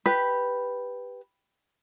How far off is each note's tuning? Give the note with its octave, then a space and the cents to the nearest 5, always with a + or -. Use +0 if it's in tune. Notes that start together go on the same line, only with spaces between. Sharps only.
G4 +0 B4 +0